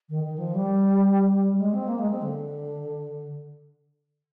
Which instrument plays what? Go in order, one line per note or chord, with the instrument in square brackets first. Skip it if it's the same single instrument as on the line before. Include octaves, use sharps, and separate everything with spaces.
[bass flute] D#3
D#3
F3
G3
G#3
C4
A#3
G#3
C4
D3